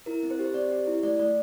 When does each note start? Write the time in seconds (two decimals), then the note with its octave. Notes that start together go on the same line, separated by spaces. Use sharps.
0.06 E4 A#4
0.23 C4
0.31 C5
0.39 G4
0.44 C5
0.54 C4 D5
0.71 G4
0.87 E4
1.03 A3 D5
1.19 A3 D5